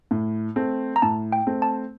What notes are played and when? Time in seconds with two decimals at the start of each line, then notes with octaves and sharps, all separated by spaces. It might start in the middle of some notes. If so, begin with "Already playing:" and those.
0.11 A2
0.56 A3 C4
0.96 A#5
1.02 A2 A5
1.32 G5
1.47 A3 C4
1.62 A5